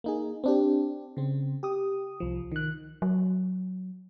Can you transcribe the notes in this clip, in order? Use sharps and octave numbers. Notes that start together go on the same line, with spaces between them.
A#3 D#4 G#4
C4 D4 G4
C#3 C4
G4 D#6
C2 F3
D#3 F#6
F#3